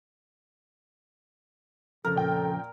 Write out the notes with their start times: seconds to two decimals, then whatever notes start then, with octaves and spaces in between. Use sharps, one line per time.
2.04 F2 C#3 A4 A#4
2.16 A#2 G5